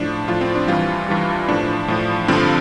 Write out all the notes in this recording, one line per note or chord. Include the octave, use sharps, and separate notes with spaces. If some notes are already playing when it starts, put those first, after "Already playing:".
Already playing: A2 F3 D4
A2 F3 F4
C4
D4
G2 E3 G3 F4
G2 E3 G3
A2 F3 D4
A2 F3
G2 D3 F3 C4